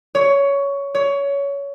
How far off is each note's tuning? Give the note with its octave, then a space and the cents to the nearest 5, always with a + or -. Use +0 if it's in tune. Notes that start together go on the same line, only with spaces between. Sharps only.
C#5 +15
C#5 +20